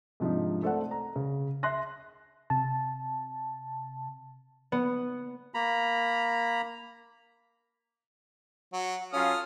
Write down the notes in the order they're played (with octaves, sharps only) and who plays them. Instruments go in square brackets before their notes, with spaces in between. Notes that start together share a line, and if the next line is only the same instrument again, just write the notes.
[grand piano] G#2 C3 F3 D4 D#4
A3 A4 C5 D5 F#5
A#5
C#3
E5 C6 F#6 A#6
[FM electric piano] C3 A5
[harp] B3
[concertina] A#3 A#5 B5
[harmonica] F#3 [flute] F#5
[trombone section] F#3 C#4 F4 [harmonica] A4 D#6 F6 [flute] F5